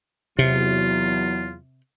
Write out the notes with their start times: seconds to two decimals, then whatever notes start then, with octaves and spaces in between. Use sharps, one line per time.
0.39 E2 C3 F#3 F4